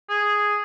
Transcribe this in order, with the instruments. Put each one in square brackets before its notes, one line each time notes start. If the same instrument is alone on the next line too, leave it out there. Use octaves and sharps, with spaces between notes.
[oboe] G#4